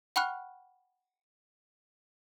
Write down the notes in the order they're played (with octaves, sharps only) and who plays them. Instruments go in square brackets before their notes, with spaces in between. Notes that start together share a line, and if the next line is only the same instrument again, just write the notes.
[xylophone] F#5 G5 B5 C#6 F6 F#6